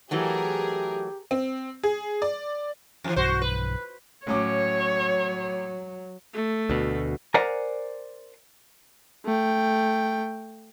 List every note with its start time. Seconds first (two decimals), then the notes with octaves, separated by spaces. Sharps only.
0.11 E3 F#3 A3 G4 G#4 A#4
1.31 C4
1.83 G#4
2.22 D5
3.04 F2 E3
3.16 B1 G2 E3 F#4 C5
3.42 B4
4.27 A2 F#3 C#4 C#5 D6
6.34 A3
6.70 D2 B2
7.34 A#4 C5 D5 F#5 G#5 A#5
9.25 A3 G5